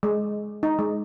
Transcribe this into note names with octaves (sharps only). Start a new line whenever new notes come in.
G#3
D#4
G#3